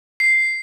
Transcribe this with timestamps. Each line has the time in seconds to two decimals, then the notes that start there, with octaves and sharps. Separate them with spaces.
0.20 C7